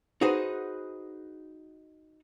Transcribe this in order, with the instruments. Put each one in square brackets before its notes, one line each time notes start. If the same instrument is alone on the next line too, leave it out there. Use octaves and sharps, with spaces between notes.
[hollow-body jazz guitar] D#4 F#4 G#4 B4 C5